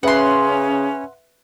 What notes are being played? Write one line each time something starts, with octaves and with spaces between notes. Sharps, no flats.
C#3 C#4 B4 E5 F#5 C6